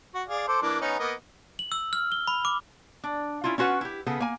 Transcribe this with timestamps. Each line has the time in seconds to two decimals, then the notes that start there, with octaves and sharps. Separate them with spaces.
0.15 F#4
0.28 G#4 D5 F5
0.48 A4 C5 D6
0.62 E3 A#3 D4
0.81 B3 C#4 D#4
0.99 A#3 B3 D#5
1.59 F#7
1.72 E6
1.93 F6
2.12 G7
2.28 B5
2.45 D6
3.04 D4
3.44 C#4 E4 F4
3.58 C#4 F4 F#4 B4 F#5
3.81 E4 G4
4.07 C#3 B3 G#4 A4
4.20 A#3 G#5